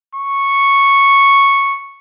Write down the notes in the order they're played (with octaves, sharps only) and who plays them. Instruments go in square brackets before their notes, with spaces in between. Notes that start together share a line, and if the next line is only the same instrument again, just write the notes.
[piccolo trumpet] C#6